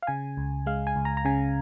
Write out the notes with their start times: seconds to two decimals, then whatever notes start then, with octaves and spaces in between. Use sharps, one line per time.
0.02 F5
0.07 C#3 G#5
0.37 C#2
0.66 G#3 F5
0.87 G#5
0.96 C#2
1.05 A#5
1.17 A#5
1.25 C#3 G#5